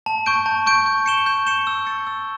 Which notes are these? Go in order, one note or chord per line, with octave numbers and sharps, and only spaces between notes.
A5
C#6 G6 D7
A5
C#6 G6 D7
G6
C#7 E7 G7
G6
C#7 E7 G7
E6
A6 C#7
E6